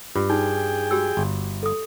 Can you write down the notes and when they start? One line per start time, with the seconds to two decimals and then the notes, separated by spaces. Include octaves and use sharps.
0.16 G2 F4
0.29 D#4 G#4 G5
0.91 F#4 G4 E6
1.17 G1
1.63 A4 D#6